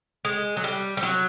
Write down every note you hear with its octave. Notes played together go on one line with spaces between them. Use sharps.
G#3
F#3
G3
G3
F#3